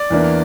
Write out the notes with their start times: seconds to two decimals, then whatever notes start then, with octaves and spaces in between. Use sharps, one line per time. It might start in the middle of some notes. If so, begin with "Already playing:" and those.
Already playing: D5
0.10 E2 E3 A#3 D4